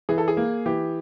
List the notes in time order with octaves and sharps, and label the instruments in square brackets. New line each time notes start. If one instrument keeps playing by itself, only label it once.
[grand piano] E3 G#4
A4
G#4
A#3
E3 G4